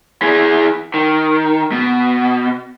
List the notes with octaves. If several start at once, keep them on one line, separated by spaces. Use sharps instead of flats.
E3 G#4
D#3
B2